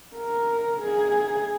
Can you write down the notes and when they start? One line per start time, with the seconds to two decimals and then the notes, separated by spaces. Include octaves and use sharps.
0.16 A#4
0.81 G#4